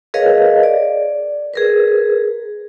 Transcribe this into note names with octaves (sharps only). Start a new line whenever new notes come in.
G#4 A#4 B4 C#5 D#5 F5
D5
G#4 A#4 B4